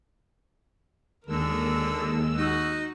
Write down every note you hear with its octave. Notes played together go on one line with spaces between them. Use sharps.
D#2 D3 G#3 A#4 E6
D#4 F#4